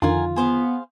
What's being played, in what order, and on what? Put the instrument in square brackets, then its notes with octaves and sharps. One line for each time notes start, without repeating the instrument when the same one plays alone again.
[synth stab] F2 D3 D#3 [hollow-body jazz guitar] F4 [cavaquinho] A#4 F#5 G#5
[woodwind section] B3 [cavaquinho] G#4 C5 F5